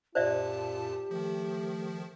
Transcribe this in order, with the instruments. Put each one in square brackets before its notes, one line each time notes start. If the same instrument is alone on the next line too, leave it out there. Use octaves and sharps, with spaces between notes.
[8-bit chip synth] F#2 A#2 A5 [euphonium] F4 [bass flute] G4 [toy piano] C5 D5 E5
[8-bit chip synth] D#3 F3 [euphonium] A3